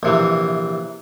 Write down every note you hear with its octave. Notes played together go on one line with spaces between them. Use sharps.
A#1 C3 E3